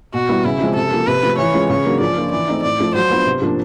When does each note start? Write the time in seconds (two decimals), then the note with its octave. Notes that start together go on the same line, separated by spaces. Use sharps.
0.14 B2 F#4
0.29 G3 B3 E4
0.45 C#3 E4
0.61 F3 G#3 C4
0.76 C3 A4
0.92 F3 A#3
1.07 C3 B4
1.23 F3 A3
1.38 E3 C#5
1.54 G#3 C#4 F4
1.70 C#3 C#5
1.85 F#3 A#3 D4
2.01 F3 D5
2.17 A#3 D4 F4
2.32 E3 D5
2.48 A3 C4 D#4
2.63 A2 D5
2.79 F3 A3
2.95 F#3 C5
3.11 B3 D4 F4
3.26 C3
3.42 F3 A#3 D4